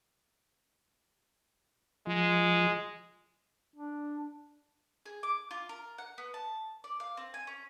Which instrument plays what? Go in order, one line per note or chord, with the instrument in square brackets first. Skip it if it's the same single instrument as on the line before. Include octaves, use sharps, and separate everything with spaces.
[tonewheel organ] F3 [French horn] G#3
[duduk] D4
[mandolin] G#4
D6
F4
A#4
F#5
B3
A5
D5
F5
C4
G#5
C#4